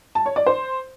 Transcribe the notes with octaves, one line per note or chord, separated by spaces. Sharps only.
A5
C#5
D5
C5